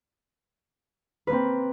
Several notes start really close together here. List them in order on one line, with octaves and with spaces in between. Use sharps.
B4 A#3 C4